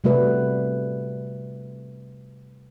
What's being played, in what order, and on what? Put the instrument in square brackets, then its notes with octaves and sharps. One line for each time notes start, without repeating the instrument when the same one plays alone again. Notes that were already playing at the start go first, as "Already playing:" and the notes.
[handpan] C3 G3 A3 F#4 B4 D5